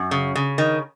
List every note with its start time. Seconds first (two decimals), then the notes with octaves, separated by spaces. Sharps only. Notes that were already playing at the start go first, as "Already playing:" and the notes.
Already playing: F#2
0.11 C#3
0.35 C#3
0.58 D#3